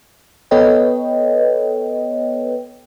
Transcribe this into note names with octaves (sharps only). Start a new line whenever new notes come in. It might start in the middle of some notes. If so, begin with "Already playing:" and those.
B3 A4 B4 C#5 D#5 G5